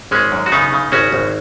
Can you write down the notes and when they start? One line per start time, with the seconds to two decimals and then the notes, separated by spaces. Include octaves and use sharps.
0.11 G#1 G#3 C#4
0.32 F#2
0.46 F#4
0.52 C#3 B3 D#4
0.72 C#3
0.92 G#1 C#4 F#4
1.12 G#1